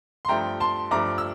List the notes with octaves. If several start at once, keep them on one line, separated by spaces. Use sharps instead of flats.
C6
G2 F3 A3 G5 A#5
A5 C6
G2 F3 A3 A#5 D6
E6